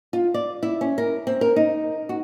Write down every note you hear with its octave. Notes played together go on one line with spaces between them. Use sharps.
F4
D5
E4
C#4
A#4
C4
A#4
D#4
F#4